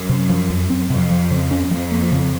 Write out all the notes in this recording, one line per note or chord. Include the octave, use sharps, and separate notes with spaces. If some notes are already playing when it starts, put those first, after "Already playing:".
Already playing: F#2
C3
F3
F2
C4
F2 C3
F3
C#3
C#4
F2 F3
A#3
C#3